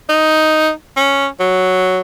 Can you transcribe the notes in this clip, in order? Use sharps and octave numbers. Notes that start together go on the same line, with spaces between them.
D#4
C#4
F#3